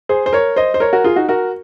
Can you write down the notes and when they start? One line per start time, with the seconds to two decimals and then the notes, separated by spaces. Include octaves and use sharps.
0.09 G#4 C5
0.26 C5
0.33 A#4 C#5
0.56 C5 D#5
0.74 C5
0.80 A#4 C#5
0.93 F#4 A#4
1.04 F4 G#4
1.16 D#4 F#4
1.29 F#4 A#4